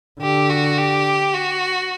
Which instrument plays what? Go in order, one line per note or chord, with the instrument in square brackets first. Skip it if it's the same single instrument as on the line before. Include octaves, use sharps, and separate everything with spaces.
[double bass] D3 [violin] G4
[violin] F#4
G4
F#4